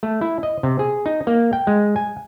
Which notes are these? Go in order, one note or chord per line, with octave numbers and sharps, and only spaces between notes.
A3
E4
D#5
C3
G#4
D#4
A#3
G5
G#3
G#5